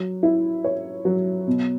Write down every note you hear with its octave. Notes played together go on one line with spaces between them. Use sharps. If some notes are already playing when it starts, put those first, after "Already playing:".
Already playing: F#3
E4
C#5
F#3
B2